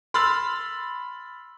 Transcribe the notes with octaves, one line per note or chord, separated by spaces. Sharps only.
B5 C6 E6 F6 A6